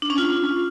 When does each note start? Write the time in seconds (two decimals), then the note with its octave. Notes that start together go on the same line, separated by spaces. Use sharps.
0.02 D4
0.10 C#4
0.18 F4